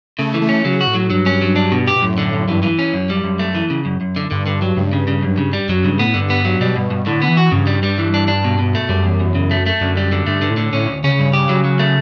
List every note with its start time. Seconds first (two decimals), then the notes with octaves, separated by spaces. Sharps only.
0.18 C#3 A3
0.34 E3
0.41 A3
0.49 C#4
0.65 C#3 F#3
0.81 F#4
0.87 A2
0.95 F#3
1.10 G2 F#3
1.26 C#4
1.42 F#3
1.56 D4
1.72 B2
1.87 G4
1.96 B2
2.02 F#2 A2
2.18 D3
2.33 F#2
2.48 G2 E3
2.63 E3
2.79 C#4
2.93 F#2
3.10 G3
3.24 F#2
3.39 A3
3.55 E3
3.70 C#3
3.85 F#2
4.01 F#2
4.16 D3
4.31 G2 D3
4.46 D3
4.62 F#3
4.77 C#2 G2
4.93 C#3
5.08 C#3
5.23 F#2
5.38 C#3
5.53 G3
5.69 F#2 F#3
5.84 G2 C#3
5.99 A2 B3
6.14 G2 D3
6.30 B3
6.45 F#3
6.61 B2 G3
6.76 G2
6.91 G2
7.06 A2 D3
7.22 B3
7.29 E3
7.37 F#4
7.51 G2 C#3
7.67 G3
7.83 G3
7.98 E3
8.14 D4
8.28 D4
8.44 B2
8.59 B2
8.75 A3
8.89 F#2 G3
9.04 E2
9.20 E2
9.35 C#3
9.51 A3
9.66 A3
9.81 F#2 D3
9.97 G3
10.12 D3
10.26 G2 A3
10.42 D3
10.50 A2
10.57 D3
10.73 A2 C#4
10.88 D2
11.04 C#3 C#4
11.19 G2
11.33 G4
11.49 F#3
11.65 F#3
11.79 A3